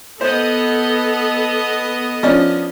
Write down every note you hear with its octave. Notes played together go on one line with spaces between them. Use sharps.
B3 A4 C5 D#5
F3 C#4 D4